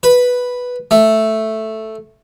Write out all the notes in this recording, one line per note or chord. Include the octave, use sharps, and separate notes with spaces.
B4
A3